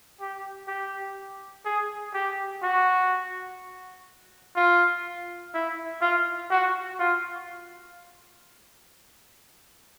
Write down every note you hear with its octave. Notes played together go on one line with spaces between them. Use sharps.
G4
G4
G#4
G4
F#4
F4
E4
F4
F#4
F4